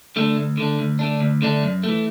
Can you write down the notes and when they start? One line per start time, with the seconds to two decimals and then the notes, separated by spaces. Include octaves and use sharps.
0.16 D3 A3 D4
0.37 D2
0.57 D3 A3 D4
0.79 D2
0.99 D3 A3 D4
1.20 D2
1.42 D3 A3 D4
1.63 F#2
1.83 E3 A3